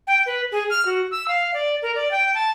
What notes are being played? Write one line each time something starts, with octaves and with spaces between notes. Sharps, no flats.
G5
B4
G#4
F6
F#4
E6
F5
D5
A#4
D5
G5
A5